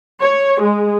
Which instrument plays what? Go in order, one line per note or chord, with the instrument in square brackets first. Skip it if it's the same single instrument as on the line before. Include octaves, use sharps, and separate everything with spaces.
[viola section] C#5
G#3